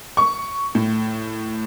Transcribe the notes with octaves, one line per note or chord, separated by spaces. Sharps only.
C#6
A2